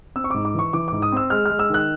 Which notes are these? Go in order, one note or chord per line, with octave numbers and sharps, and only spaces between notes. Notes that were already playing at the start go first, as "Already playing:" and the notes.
C4 E6
C#6
G#2 D6
D6
E3 C#6
E3 D6
G#2 D6
D#6
C4 E6
G#3 F6
G#3 F6
E6
D#3 F#6